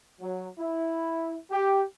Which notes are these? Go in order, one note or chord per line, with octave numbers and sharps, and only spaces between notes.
F#3
E4
G4